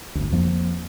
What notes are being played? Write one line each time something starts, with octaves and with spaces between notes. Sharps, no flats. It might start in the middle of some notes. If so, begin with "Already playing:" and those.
G1 D2
F2 F3 A3 A#3